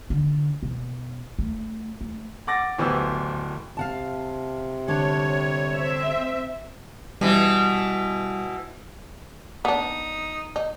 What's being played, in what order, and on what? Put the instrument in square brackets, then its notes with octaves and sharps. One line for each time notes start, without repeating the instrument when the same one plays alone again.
[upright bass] D3
B2
A3
A3
[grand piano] F#5 D6 A6 A#6
D1 E3 B3 G4 C5 E6
[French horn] C3 [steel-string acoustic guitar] F5 F#5 A5
[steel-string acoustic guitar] D3 G3 D4 [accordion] C#5
[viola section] C4 E5
[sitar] B2 E3 [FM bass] G3
[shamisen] B3 D4 [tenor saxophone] D#4
[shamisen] D#4